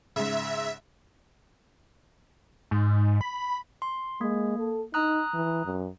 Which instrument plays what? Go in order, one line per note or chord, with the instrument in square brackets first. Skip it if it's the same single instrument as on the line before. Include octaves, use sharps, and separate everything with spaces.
[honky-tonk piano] G#2 C#3 [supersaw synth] E5
[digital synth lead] G#2
B5
[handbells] C6
[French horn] G#3 [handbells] A#3
[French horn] A4
[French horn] D#4 [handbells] A#5 D#6 F#6
[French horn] E3
F#2